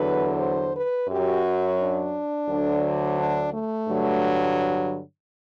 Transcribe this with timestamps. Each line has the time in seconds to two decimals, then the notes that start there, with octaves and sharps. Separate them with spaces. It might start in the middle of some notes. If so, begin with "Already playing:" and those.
Already playing: E2 D3 F#3 B4
0.39 C5
0.75 B4
1.09 F#2 F#3 G4
1.79 D4
2.49 D2 D3 F#3
3.18 D4
3.53 A3
3.88 G2 D3 F#3